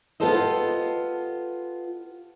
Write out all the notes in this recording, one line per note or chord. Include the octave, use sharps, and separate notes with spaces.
B3 F4 G4 A4 C5 D#5